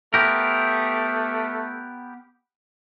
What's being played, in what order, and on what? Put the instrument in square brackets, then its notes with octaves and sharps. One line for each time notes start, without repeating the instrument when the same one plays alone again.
[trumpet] A3 [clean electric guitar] B3 G4 A#4